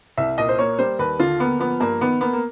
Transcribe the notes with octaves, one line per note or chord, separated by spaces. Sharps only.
C2 E5
A#2 D#5
C5
A#3 C#5
G3 C5
D#2 B4
D3 F4
A#3 B3
F3 B3
G2 A#3
D#3 B3
A#3 B3
A#3